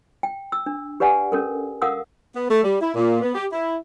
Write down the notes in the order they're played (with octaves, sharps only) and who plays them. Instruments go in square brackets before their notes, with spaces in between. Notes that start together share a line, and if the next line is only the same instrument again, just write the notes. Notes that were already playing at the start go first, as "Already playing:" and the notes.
[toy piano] G5
E6
D4
G4 B4 D5 F#5 G#5
C#4 A4 A#4
A#4 F5 F#5 D#6 E6
[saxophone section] B3
A3
G3
E4
A#2
B3
G4
E4